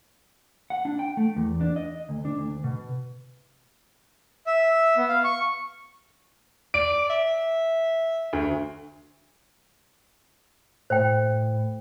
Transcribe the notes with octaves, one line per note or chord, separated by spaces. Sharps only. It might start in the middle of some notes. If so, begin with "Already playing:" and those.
F#5
D4
G5
A3
E2
D4
D#5
D2
D4
D2
B2
E5
B3
F5
C#6
D5 D7
E5
D2
A2 C5 G5